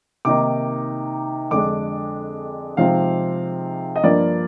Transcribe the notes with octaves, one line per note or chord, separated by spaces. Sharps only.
C3 D#3 A#3 D#4 D6
F2 D3 G#3 D4 D6
C3 F3 G#3 C4 D#4 F5
D#5
G2 F3 A#3 D5